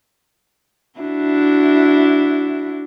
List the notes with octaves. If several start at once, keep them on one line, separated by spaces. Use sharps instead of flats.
D4 E4 F#4